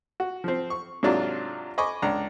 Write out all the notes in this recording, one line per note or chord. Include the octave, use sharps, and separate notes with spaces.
F#4
F3 C4
C#6
G#2 C3 F#3 D4 F4
D#5 G#5 B5 C#6 D6
C#2 D4 A#5